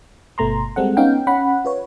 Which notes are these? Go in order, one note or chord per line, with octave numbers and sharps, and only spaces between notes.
G1 B2 A3 A#5 C6
G3 G#3 C4 A4 F#5
B3 C#4 D#4 F5 G5
C#4 F#5 B5
F4 B4 C#5